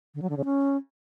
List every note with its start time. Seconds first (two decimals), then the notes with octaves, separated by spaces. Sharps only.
0.15 D3
0.22 F#3
0.30 D3
0.37 C#3
0.45 C#4